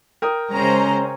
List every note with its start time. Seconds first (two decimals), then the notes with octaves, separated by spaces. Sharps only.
0.22 A#4 G5 D#6
0.52 C#3 G#3 C#4 C5 A#5